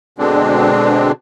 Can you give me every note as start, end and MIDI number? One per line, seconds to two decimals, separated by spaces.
0.19 1.12 47
0.19 1.12 50
0.19 1.12 56
0.19 1.12 60
0.19 1.12 62